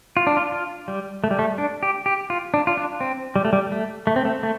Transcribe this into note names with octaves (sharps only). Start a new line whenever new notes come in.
F4
D4
F4
F4
G3
A3
G3
A3
D4
G4
G4
F4
D4
F4
D4
C4
G3
A3
G3
A3
A3
C4
A3
A3